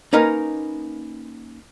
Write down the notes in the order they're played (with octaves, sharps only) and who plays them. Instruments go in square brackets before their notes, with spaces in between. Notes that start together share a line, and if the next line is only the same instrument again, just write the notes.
[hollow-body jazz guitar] A#3 C#4 D#4 A#4 B4